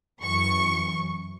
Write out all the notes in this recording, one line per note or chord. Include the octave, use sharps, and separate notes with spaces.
F#2 E3 C#6